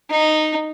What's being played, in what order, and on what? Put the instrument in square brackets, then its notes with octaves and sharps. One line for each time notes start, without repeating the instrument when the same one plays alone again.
[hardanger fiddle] D#4